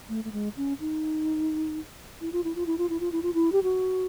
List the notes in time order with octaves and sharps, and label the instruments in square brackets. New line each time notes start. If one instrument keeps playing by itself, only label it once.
[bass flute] A3
A3
G#3
C#4
D#4
E4
F4
E4
F4
E4
F4
E4
F4
E4
F4
E4
G4
F#4